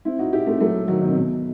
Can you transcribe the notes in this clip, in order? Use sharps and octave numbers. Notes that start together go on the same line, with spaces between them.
C4 E4
D#4 F#4
E4 G4
A3 C4
F#3 A3
D#3 F#3
B2 D#3
C3
B2